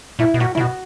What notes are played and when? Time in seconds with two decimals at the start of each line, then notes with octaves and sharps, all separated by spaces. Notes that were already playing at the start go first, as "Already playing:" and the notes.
0.19 A#2 E4
0.34 B2
0.40 A#2 F#4
0.55 C#3 E4
0.60 B2 F#4